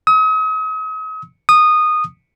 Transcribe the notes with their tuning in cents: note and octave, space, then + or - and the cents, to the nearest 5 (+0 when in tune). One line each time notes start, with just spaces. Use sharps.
D#6 +40
D#6 -15